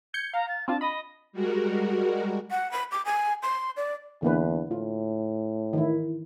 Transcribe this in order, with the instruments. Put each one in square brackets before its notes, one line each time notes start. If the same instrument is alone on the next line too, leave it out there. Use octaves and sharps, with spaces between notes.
[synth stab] G6 C#7 [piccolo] G#6
[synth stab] F5 [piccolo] A#5
[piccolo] A6
[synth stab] C4 D4 F4 [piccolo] A5
[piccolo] D#5 [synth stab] B5
[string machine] G3 G#3 F#4 A#4
[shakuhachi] F#5
B5
D6
G#5
C6
D5
[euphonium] E2 [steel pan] D3 A#3 B4
[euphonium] A2 [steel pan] F4
[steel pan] D#3 E3 E4